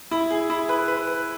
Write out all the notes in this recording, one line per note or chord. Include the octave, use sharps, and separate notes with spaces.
E4
G#4
E4
B4
B4
B4